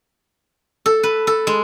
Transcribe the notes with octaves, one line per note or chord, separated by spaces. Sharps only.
A4
B4
A4
G#3